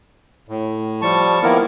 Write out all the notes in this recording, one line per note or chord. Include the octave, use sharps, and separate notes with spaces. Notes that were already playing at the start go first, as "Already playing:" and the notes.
A2
F3 G3 A5 C#6
D#3 F3 A#3 B3 E4 A#4